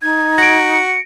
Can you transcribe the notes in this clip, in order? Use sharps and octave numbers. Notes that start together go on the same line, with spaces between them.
D#4 G#6
F#4 A#6 D7
C#7